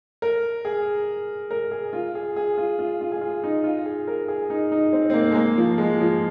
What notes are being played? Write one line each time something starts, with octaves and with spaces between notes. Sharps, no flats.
A#4
G#4
A#4
G#4
F4
G#4
G#4
F4
F4
F4
G#4
F4
D#4
F4
G#4
A#4
G#4
D#4
D#4
C4
C4
A#3
G#3
A#3
F3
G#3
F3